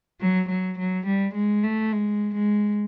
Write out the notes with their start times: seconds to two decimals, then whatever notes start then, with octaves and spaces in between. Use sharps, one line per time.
0.21 F#3
0.49 F#3
0.78 F#3
1.06 G3
1.34 G#3
1.63 A3
1.92 G#3
2.35 G#3